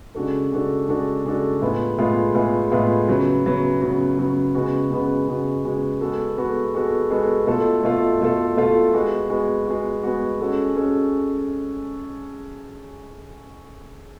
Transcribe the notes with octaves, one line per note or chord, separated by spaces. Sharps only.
C#3 G#3 D4 F#4 A4
C#3 G#3 D4 F#4 A4
C#3 G#3 D4 F#4 A4
C#3 G#3 D4 F#4 A4
A2 G#3 B3 F4 G#4
A2 G#3 B3 F4 G#4
A2 G#3 B3 F4 G#4
A2 G#3 B3 F4 G#4
C#3 F#3 B3
C#3 F#3 B3
C#3 F#3 B3
C#3 F#3 B3
C#3 G#3 B3 F#4
C#3 G#3 B3 F#4
C#3 G#3 B3 F#4
C#3 G#3 B3 F#4
G#3 B3 F#4 A4
G#3 B3 F#4 A4
G#3 B3 F#4 A4
G#3 B3 F#4 A4
B2 A3 F4 A4
B2 A3 F4 A4
B2 A3 F4 A4
B2 A3 F4 A4
G#3 B3 F#4
G#3 B3 F#4
G#3 B3 F#4
G#3 B3 F#4
G#3 C#4 F#4 A4
G#3 C#4 F#4 A4